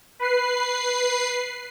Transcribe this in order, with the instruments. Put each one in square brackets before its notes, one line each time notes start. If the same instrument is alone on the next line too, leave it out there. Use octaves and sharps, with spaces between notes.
[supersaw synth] B4 C7